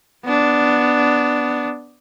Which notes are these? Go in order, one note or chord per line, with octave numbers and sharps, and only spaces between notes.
B3 D4